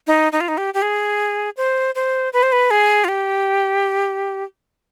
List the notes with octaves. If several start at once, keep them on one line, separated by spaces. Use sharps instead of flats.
D#4
D#4
F4
D#4
G4
G4
G#4
C5
C5
B4
C5
B4
G#4
F4
G4